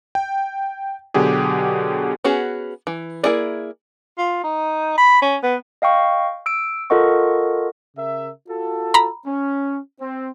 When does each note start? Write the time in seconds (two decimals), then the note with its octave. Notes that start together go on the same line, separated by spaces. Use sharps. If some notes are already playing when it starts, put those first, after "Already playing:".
0.15 G5
1.14 B2 D3 F#3 G4 G#4
2.24 B3 C#4 F#4 G#4
2.87 E3
3.23 A#3 D#4 E4 G#4 D5
4.18 F4
4.44 D#4
4.98 B5
5.22 C#4
5.43 B3
5.82 D#5 F5 G5 C#6
6.46 E6 D7
6.90 F4 A4 A#4 D#5 F#5 C#6
7.96 C#3 A#4 E5
8.48 F4 F#4 A4
8.94 A#5 B5
9.26 C#4
10.00 C4